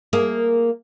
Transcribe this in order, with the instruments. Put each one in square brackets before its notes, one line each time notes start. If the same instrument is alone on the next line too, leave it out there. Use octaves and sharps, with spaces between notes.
[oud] A#3 G#4